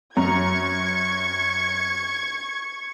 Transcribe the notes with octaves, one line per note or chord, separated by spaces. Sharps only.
F#2 A#5 C#6 G#6